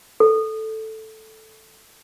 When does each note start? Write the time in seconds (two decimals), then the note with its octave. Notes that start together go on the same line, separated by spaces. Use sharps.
0.20 A4